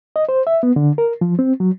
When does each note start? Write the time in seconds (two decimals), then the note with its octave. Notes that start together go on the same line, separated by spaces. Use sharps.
0.16 D#5
0.29 C5
0.47 E5
0.63 B3
0.76 D3
0.98 A#4
1.21 F3
1.39 C4
1.60 F#3